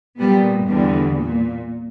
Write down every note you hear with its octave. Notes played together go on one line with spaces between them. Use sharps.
A#2 G3 B3
E2 D3 G3
A#2